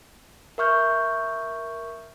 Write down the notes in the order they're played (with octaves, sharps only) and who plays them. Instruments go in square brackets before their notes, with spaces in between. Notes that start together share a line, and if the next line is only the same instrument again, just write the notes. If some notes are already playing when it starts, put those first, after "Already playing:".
[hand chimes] A#4 E5 C#6 F6 G6